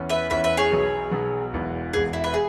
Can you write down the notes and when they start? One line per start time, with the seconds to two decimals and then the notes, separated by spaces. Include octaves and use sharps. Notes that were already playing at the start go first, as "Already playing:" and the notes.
Already playing: E2 E3 C#4
0.09 B4 E5
0.30 E2 E3 C#4 B4 E5
0.44 B4 E5
0.57 G#4 C#5
0.72 B1 B2 F#3 B3
1.11 B1 B2 F#3 B3
1.53 E1 E2 E3
1.93 E1 E2 E3 G#4
2.13 E4
2.24 B4 E5
2.34 G#4